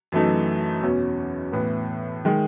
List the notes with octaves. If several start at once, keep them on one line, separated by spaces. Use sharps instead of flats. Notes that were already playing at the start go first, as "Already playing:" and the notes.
F#2 E3 A3 D#4
E2 B2 F#3 C#4
A2 E3 B3
D#3 G#3